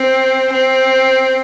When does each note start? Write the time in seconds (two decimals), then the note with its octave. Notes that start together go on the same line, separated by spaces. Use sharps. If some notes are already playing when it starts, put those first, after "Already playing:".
Already playing: C4
0.52 C4